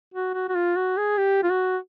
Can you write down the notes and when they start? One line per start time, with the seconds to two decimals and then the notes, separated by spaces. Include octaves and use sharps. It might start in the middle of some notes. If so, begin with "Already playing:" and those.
0.14 F#4
0.34 F#4
0.49 F#4
0.55 F4
0.76 F#4
0.97 G#4
1.18 G4
1.43 F4
1.50 F#4